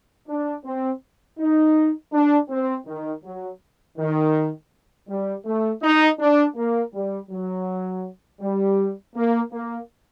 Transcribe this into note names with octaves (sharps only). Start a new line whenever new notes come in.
D4
C4
D#4
D4
C4
D#3
F#3
D#3
G3
A3
D#4
D4
A#3
G3
F#3
G3
A#3
A#3